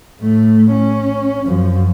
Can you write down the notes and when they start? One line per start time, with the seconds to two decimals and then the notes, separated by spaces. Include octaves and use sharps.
0.21 A2 A3
0.72 C#4
1.46 F#2 F3